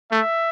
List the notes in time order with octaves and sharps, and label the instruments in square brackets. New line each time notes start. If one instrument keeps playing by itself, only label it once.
[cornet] A3 [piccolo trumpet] E5